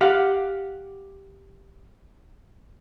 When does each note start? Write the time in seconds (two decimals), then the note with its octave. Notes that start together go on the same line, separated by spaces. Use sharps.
0.01 G4 F5 F#5